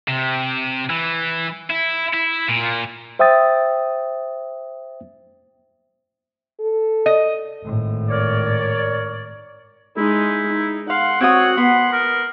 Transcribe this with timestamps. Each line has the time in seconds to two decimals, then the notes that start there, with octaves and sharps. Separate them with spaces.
0.08 C3
0.90 E3
1.70 E4
2.14 E4
2.49 A#2
3.19 C5 E5 G5 D#6 A6
6.60 A4
7.06 D#5
7.64 G#1 A2
8.09 A#4 C#5 D5
9.97 G#3 D#4 E4
10.52 D#4
10.90 F5 F#5 C6
11.21 C4 F#4 C#5 D#6
11.58 B3 C6
11.92 A#4